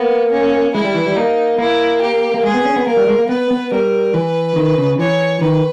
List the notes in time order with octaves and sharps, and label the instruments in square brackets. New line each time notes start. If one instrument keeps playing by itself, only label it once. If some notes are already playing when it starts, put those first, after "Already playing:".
Already playing: [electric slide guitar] A#3 [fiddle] B3
[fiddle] C#4
[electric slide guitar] G#3 [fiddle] E4
[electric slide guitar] G3
E3
G3
[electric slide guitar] A#3 [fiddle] D#4
[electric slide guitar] A#3 [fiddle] E4
[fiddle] G4
[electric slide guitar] A#3
[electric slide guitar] G#3 [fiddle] G#4
[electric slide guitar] B3
C#4
B3
[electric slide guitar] A#3 [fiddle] A#4
[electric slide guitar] G3
G#3
A#3
[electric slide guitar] B3 [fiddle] B4
[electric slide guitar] B3
[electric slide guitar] G3 [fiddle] A#4
[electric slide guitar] E3 [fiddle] B4
[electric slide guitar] D#3
C#3
[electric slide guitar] E3 [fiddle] C#5
[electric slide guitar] D#3 [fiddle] B4